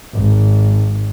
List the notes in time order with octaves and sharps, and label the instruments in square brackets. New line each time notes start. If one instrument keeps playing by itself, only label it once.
[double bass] G#1